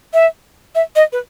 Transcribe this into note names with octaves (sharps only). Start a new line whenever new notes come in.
E5
E5
D#5
B4